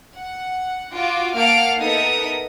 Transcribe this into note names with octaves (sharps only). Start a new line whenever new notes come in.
F#5
F4 F#4 D6
A#3 F5 F#5 A5 F6 D7
B3 D#4 A4 A#4 E5 D#6